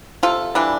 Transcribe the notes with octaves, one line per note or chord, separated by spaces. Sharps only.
C3 F4 A4
E3 G3 D4